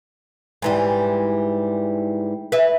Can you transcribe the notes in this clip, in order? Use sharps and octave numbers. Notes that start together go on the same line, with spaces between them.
G#2 E3 G3
B4 E5